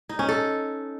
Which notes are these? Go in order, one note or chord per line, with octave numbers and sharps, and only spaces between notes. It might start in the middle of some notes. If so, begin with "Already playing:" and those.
D#4
C#4
A4